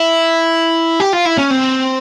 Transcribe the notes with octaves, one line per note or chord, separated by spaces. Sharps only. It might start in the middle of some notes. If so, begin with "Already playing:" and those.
Already playing: E4
G4
F4
E4
C#4
C4